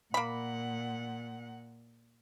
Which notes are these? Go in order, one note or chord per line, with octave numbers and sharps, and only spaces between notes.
A#2 A#3 F#5 B5